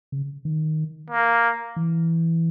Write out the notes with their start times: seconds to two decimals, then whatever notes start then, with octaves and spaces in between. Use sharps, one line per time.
0.12 C#3
0.45 D#3
1.10 A#3
1.76 E3